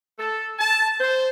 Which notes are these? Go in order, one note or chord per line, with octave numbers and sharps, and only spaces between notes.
A4
A5
C5